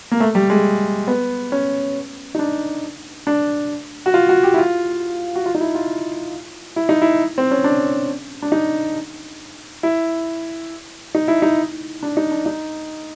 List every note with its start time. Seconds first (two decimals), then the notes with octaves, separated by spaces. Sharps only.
0.11 A#3
0.20 A3
0.35 G3
0.50 G#3
1.08 B3
1.52 C#4
2.35 D#4
2.39 D4
3.27 D4
4.06 F#4
4.14 F4
4.29 F#4
4.43 G4
4.54 E4
4.58 F4
5.36 F#4
5.46 F4
5.55 D#4
5.61 E4
5.75 F4
6.76 E4
6.89 D#4
7.02 E4
7.38 C4
7.51 C#4
7.64 D4
8.42 D4
8.52 D#4
9.83 E4
11.15 D#4
11.28 E4
11.42 D#4
12.03 D4
12.17 D#4
12.32 D4
12.46 D#4